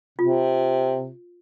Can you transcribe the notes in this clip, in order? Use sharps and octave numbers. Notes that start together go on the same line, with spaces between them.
C3 F4